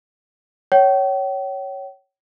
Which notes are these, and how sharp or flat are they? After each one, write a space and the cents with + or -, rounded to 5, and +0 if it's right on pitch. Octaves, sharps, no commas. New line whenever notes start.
C#5 +0 G5 -40